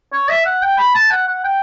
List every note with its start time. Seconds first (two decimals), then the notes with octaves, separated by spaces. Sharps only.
0.13 C#5
0.29 E5
0.46 F#5
0.62 G5
0.78 B5
0.95 A5
1.11 F#5
1.27 F#5
1.44 G5